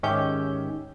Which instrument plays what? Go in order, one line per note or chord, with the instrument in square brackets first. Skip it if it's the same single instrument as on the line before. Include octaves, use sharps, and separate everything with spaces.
[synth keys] G#2 D#3 C#4 G4 E5 G6